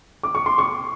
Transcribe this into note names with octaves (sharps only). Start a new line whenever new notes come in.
D6
C#6
C6
C#6